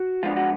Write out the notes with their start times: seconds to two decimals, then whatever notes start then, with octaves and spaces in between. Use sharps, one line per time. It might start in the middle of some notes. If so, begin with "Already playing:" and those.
Already playing: F#4
0.23 F3 G#3 B3 D4 F4
0.36 F#4